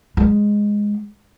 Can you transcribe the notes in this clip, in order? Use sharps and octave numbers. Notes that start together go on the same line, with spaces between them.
G#3